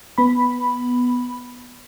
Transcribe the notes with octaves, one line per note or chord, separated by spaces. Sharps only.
B3 B5